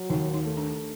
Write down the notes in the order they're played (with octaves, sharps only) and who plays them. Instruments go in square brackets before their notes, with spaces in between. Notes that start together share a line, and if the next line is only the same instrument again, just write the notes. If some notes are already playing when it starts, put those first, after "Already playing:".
Already playing: [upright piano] F#3
[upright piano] D#2 [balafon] D#4
[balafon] D#4
[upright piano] A3
[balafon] D4